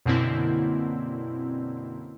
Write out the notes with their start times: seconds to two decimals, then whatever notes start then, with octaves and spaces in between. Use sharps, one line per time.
0.06 F#2 B2 D3 A#3 C4 E4